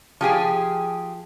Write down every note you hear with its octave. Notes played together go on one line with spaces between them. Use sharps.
F3 G4 G#4 G#5